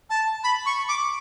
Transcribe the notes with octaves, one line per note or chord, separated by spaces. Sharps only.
A5
B5
C#6
D6